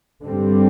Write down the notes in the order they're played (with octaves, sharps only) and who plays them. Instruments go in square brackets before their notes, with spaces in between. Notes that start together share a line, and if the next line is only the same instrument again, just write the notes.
[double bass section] G2 D3 G3 C4